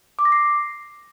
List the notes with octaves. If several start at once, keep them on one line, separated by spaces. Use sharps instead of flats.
D6
A#6
C7